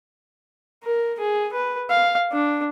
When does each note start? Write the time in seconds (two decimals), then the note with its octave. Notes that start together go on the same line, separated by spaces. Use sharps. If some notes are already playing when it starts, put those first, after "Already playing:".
0.84 A#4
1.20 G#4
1.53 B4
1.90 F5
2.32 D4